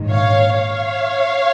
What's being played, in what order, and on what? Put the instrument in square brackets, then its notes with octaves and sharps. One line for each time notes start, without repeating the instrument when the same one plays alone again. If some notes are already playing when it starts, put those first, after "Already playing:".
Already playing: [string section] A#1 G#2 D#3
C#5 F5
C#5 F5